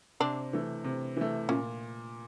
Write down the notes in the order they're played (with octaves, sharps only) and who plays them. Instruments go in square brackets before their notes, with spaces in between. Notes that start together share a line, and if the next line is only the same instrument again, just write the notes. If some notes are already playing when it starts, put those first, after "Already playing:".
[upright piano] C3 [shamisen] C4 D4
[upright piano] E3 A3
C3
E3 A3
[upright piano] A#2 [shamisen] C#4